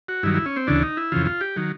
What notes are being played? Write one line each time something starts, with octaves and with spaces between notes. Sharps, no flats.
F#4
G2 D#3 F#3 E4
E4
C#4
C4
D2 C#3 E3 D4
D#4
E4
F2 C#3 E3 F4
F4
G4
D#3 F#3